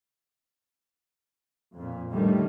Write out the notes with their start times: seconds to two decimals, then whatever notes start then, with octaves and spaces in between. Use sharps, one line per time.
1.76 F2 A#2
2.13 A2 D3 D#3 G3 A3